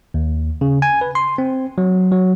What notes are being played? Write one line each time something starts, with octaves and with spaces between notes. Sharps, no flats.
D#2
C#3
G#5
B4
C6
C4
F#3
F#3